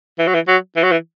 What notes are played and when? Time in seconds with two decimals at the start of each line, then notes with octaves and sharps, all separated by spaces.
0.19 E3
0.27 F#3
0.34 E3
0.48 F#3
0.77 E3
0.83 F#3
0.92 E3